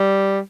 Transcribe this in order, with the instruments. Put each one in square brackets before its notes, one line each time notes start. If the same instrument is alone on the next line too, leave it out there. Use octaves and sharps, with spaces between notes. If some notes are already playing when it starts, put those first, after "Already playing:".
Already playing: [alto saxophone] G3